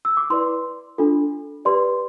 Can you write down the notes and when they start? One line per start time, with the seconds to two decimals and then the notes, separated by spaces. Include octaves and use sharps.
0.05 E6
0.17 D6
0.30 E4 B4 D5 C6
0.98 D4 F4 A4
1.65 G4 B4 D5 C6